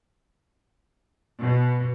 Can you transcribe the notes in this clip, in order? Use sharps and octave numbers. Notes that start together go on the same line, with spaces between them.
B2